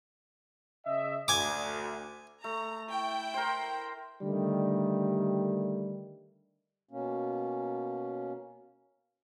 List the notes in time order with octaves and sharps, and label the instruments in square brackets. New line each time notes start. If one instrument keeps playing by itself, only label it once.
[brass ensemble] C#3 D#5 E5
[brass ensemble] D2 [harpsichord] G#5 D6
[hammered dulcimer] A3 [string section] A#5
[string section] E4 G5
[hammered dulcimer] A#4 C5
[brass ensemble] D3 D#3 G3 A3
[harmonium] B2 A#3 C#4